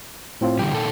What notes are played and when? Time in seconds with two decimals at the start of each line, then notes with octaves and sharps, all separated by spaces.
0.41 A2 C4 F4
0.59 D3 E3 G3 G5
0.72 A#2 D#3 A4